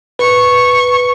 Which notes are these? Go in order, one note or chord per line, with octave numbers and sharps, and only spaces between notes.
B4 C#6